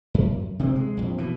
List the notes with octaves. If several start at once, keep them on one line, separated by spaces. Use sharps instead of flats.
F#2
C3 A#3 C4
G#3
A#1 F2
B2 E3